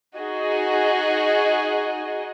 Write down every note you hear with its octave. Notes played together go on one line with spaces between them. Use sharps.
D#4 F#4 G#4 D#5